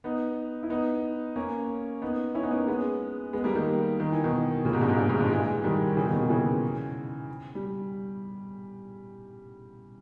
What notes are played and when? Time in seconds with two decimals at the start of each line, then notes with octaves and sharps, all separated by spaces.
0.04 B3 D#4
0.63 E4
0.70 B3 D#4
1.36 A#3 C#4
2.02 B3 D#4
2.34 C#4 E4
2.43 B3 D#4
2.51 A#3 C#4
2.67 G#3 B3
3.33 G#3 B3
3.44 G3 A#3
3.55 D#3 G3
4.00 D#3
4.12 E3
4.24 B2 D#3
4.65 A#2 C#3
4.73 G#2 B2
4.81 G2 A#2
4.90 G#2
4.98 G2
5.09 G#2
5.20 G2 A#2
5.30 E3 G#3
5.64 D#3 G3
5.97 C#3 E3
6.05 B2 D#3
6.13 A#2 C#3
6.21 B2 D#3
6.29 C#3 E3
7.55 G3